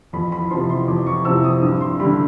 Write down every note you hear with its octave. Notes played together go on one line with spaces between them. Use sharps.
F2 B5
B5
C3 F3 C6
C6
F2 D6
C#6
C3 F3 E6
D#6
G2
C6
D3 G3 B5